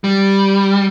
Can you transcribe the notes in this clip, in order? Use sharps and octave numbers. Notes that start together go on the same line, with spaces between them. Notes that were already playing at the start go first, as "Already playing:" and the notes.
G3